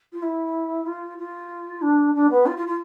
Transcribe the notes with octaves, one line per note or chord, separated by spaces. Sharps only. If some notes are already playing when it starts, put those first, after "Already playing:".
F4
E4
F4
F4
D4
D4
B3
F4
F4
F4